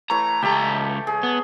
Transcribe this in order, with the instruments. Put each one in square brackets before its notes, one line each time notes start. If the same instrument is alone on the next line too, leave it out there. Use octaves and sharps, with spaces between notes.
[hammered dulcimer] E3 A3 C#5 [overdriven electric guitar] A#5
[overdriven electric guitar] C#2 A#5 [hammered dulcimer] G4 A4
[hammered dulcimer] G#4
[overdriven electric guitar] B3